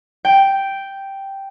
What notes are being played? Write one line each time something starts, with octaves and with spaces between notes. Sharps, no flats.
G5